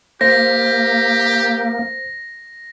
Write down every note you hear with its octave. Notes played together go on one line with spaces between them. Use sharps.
A#3 G4 C5 A#6